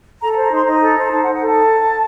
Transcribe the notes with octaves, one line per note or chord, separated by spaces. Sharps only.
A4 A#5
A#5
C5
A#5
D#4 C6
D#4 A#5
A4
C5
D#4 A5
F#5
D#4
F#5
A4 A5